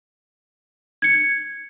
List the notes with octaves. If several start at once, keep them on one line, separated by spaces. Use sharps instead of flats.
G#6 C#7